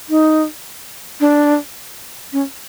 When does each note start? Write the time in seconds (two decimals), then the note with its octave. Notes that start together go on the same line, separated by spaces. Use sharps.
0.09 D#4
1.20 D4
2.32 C#4